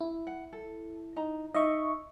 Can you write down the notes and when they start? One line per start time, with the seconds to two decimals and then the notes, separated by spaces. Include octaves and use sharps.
0.01 E4
0.27 F#5
0.53 A4
1.16 D#4 A#5
1.54 D#4 D#5 E5 C#6